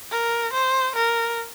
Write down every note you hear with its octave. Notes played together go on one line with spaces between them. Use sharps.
A#4
C5
A#4